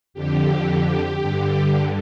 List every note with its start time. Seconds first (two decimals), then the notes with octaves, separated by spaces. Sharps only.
0.14 F2 D3 G4
1.21 G2 D3